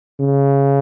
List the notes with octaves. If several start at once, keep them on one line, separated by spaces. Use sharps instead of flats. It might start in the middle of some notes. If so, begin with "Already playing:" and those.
C#3